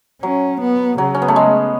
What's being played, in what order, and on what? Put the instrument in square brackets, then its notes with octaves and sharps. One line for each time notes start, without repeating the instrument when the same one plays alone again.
[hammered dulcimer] F#3 [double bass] C#4
[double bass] B3
[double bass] C#3 [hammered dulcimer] F#3
[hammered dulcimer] C#4
B3
A3
G#3